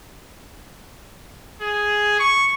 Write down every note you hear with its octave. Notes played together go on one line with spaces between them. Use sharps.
G#4
C#6